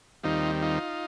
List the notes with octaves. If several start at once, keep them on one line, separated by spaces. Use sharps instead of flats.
D#2 D#3 G3 C4 D#4 F4
D#4 F4